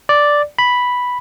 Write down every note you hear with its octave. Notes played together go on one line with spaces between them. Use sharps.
D5
B5